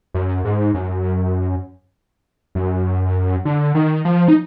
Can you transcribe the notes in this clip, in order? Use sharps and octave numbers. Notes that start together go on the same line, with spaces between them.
F#2
G#2
F#2
F#2
D3
D#3
F3
D#4